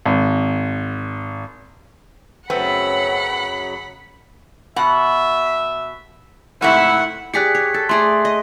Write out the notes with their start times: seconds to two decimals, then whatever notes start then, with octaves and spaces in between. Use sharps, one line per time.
0.05 G#1
2.50 F#2 C#3 F#3 A3 B3 C4 F#5 B5
4.76 B2 E5 F#5
6.62 G#2 C3 A3 E4 E5 F#5
7.34 G4 G#4 D5 F#6 B6 C#7
7.55 C#5
7.74 A4
7.89 A3 G#4 D5 C6
8.25 D#5